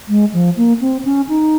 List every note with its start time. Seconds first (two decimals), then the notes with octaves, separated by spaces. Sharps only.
0.09 G#3
0.33 F3
0.57 A#3
0.81 C4
1.05 C#4
1.28 D#4